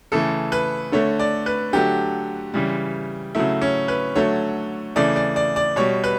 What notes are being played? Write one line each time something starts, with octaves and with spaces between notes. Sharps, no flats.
C#3 E3 A3 A4
B4
D3 A3 C#5
D5
B4
D3 F#3 A3 G4
C#3 E3 G3
C#3 F#3 A3 E4
C#4
B4
D3 F#3 A3 C#5
C#3 E3 A3 D5
D5
D5
D5
B2 G3 C#5
B4